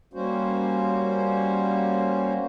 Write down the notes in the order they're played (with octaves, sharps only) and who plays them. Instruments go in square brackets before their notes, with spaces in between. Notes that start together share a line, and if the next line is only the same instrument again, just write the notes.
[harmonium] G3 A#3 C#4 F#4 C5